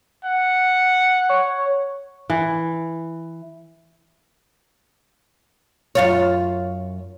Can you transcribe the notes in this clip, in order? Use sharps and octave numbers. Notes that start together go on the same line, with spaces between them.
F#5
C#5
E3
F#2 F4 C#5